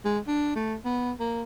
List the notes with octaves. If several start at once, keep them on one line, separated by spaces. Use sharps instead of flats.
G#3
D4
A3
B3
A#3